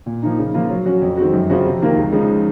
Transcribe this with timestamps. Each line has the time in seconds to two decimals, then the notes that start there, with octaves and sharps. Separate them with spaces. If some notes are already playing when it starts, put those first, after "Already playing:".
0.06 A#2
0.22 F3 A#3 D#4
0.39 C#3
0.54 F3 A#3 F4
0.70 F#3
0.86 C#4 F#4
1.02 F2
1.17 D#3 G#3 C4 F#4
1.33 F#2
1.50 C#3 F3 C4 F#4
1.65 C3
1.82 D#3 A#3 F4 A#4
1.96 C#2
2.12 C#3 F3 G#3 D#4